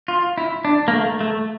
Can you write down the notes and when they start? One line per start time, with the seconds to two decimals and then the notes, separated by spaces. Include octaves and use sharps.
0.08 F4
0.38 E4
0.65 D4
0.88 A#3
0.94 A3
1.21 A3